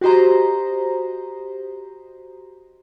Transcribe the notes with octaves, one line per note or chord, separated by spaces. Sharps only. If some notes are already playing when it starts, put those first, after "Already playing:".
F#4 G4 C5 D#5 A#5